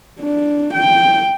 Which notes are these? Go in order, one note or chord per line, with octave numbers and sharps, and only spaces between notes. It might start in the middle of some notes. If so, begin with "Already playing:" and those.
D4
G5